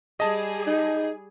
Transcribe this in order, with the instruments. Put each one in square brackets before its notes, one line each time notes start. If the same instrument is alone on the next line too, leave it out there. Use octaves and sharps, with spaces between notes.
[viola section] G3 G#4 [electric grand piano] D#5 A5
[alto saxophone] D#4